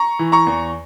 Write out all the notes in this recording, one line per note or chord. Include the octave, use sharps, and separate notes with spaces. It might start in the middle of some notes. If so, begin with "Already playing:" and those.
Already playing: A#5 C#6
E3
A#5 C#6
E2